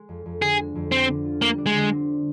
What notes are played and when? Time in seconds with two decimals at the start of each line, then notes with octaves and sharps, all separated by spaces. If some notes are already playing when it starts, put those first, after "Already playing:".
Already playing: G#3
0.09 F2
0.26 F2
0.42 D3 G#4
0.59 G#3
0.75 F2
0.92 C4 D4
1.08 D3
1.25 F4
1.41 G3 A#3
1.58 D4
1.66 G#3
1.75 D3
1.92 C4